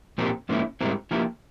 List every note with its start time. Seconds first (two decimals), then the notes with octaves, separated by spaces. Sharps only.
0.18 A#2 F3 C4 G4 A#4
0.49 G#2 F3 A#3 C#4 E4
0.81 G#2 G3 C4 E4 A#4
1.11 F3 A#3 E4 G4 A#4